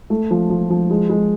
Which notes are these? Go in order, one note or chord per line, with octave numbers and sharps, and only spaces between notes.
A3
F3
F3
F3
G#3
G#3